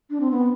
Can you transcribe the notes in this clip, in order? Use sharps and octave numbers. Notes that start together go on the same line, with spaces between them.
D4
C4
B3